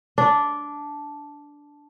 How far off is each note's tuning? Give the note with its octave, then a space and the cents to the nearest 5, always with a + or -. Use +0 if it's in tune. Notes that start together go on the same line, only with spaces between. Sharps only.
D4 -10